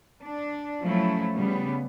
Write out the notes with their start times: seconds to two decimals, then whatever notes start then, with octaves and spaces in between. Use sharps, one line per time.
0.19 D4
0.83 F3 F#3 A3 C#4 E4
1.36 C#3 G3 B3